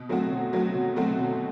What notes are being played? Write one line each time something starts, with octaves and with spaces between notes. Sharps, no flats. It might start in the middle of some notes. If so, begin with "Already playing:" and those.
Already playing: B2
F#3 A3 C4 F#4
B2
F#3 A3 C4 F#4
B2
F#3 A3 C4 F#4
B2